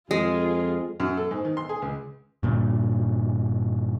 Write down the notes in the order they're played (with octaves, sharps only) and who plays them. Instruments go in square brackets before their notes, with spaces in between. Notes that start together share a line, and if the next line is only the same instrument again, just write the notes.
[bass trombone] F2 [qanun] G#3 [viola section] F4 G#4
[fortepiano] F#2
A4
G#2
D#3
C6
G#4
C#2
[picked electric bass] G2 A#2 D3